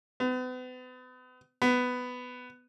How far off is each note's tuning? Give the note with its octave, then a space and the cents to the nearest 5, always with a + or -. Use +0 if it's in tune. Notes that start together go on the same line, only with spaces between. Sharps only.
B3 +40
B3 +10